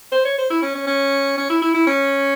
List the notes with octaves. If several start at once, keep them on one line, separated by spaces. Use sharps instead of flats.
C5
C#5
C5
E4
C#4
C#4
C#4
C#4
E4
E4
E4
C#4